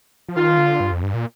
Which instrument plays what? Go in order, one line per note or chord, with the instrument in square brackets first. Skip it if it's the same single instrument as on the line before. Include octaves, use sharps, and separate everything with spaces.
[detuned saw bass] F3
[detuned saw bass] D#3 [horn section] F4
[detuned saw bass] D3
G2
F2
G2
A#2